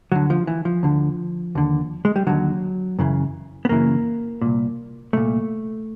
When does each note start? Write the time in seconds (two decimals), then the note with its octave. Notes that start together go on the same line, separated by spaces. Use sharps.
0.12 D2 D3 F#3
0.30 F3
0.47 E3
0.65 F3
0.83 D2 D3
1.55 D#2 D3
2.05 G#3
2.16 G3
2.27 D#2 D3 F#3
2.99 F#2 C#3 E3
3.65 B3
3.69 F#2 C#3 E3 A#3
4.42 C2 A#2
5.13 C2 A#2 A3